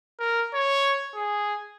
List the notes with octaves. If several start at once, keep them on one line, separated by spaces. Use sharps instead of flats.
A#4
C#5
G#4